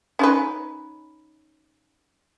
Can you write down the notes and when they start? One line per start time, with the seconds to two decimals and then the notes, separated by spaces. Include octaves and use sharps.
0.19 C#4 D#4 B4